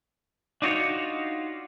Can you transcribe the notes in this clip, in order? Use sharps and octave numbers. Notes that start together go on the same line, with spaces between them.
D4 D#4 F4 F#4 B4 C#5